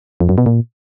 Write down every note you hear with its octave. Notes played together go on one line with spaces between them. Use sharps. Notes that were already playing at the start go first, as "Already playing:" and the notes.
F2
F#2
B2
A#2